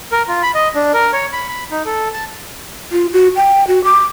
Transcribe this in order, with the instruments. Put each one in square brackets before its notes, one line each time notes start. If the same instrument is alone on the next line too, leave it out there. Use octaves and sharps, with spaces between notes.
[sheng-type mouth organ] A#4
F4
B5
D#5
D4
A#4
C#5
B5
B5
D#4
A4
A5
[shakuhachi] F4
F#4
G5
F#4
D6